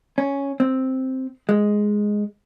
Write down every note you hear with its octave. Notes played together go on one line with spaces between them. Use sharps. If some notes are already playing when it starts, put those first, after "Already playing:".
C#4
C4
G#3